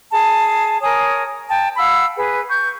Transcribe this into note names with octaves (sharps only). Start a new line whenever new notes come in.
G#4 A5
A#4 C#5 G#5 D#6
G5 A5
F5 F#5 B5 E6
G#4 B4
C#6 G6